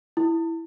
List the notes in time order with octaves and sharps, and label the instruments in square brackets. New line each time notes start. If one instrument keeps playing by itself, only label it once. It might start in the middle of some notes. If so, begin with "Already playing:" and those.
[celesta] E4